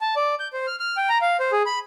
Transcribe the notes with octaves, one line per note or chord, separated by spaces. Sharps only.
A5
D5
G6
C5
F6
F6
G5
A#5
F5
C5
G#4
B5